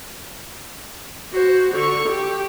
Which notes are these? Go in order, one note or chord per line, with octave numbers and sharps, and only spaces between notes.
F#4 C5
D3 C#6
G4